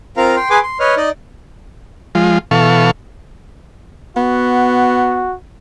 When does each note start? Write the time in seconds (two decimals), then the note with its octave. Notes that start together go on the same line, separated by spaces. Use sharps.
0.17 C4 F4 A#4 F5 A#5
0.36 G5 C6
0.50 G#4 B4 G#5 C6 D6
0.63 C6
0.80 B4 C#5 D#5 F6
0.97 D#4 D5 D#5
2.15 F3 G#3 F4
2.51 B2 E3 A4 F5 C#6
4.17 B3 F#4